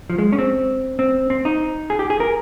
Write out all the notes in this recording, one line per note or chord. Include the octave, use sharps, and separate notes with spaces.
F3
G#3
C#4
C4
C4
C4
D#4
G#4
G4
G#4
A#4